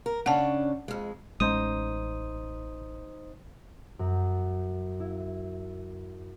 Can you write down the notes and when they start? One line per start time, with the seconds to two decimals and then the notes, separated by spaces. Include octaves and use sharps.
0.06 A#4
0.26 C#3 C#4 D4 F#5 A5
0.88 F2 G#3
1.40 A1 G#3 C#4 D#4 C5 D#6
3.99 F#2
5.00 E4